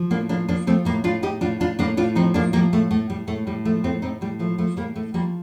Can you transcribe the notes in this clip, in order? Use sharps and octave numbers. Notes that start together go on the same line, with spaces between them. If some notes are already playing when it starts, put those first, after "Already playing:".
Already playing: F3
A2 A#3 D4
F3 A#3 D4
F3 A#3 D4
F3 A3 C4
A2 G3 A#3
A2 D4 F4
A2 D#4 G4
A2 D4 F4
A2 D4 F4
A2 A#3 D4
A2 D4 F4
F3 C4 D#4
A2 A#3 D4
F3 G3 A#3
A2 A3
A2 A3
A2 G3
A2 A3
A2 G3
F3 A3
A2 A3 C4
A2 C4 D#4
A2 G3
F3 A3
F3 A3
A2 G3 A#3
A2 A3
F3 G3 A#3